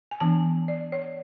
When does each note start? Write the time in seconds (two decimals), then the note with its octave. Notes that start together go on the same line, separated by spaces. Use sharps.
0.11 G#5
0.20 E3 B3 D4 A5
0.68 D5
0.92 C#5